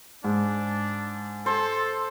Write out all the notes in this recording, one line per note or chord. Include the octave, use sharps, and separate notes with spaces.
G#2 D4
A4 C5